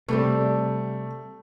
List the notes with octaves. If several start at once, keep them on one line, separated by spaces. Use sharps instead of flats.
C3 G3 A3 G4 A4